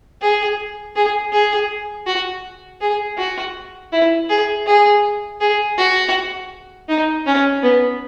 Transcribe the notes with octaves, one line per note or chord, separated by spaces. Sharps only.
G#4
G#4
G#4
F#4
G#4
F#4
E4
G#4
G#4
G#4
F#4
D#4
C#4
B3